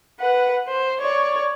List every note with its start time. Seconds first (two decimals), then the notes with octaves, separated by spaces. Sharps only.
0.20 B4 F#5
0.68 C5
1.01 C#5 D5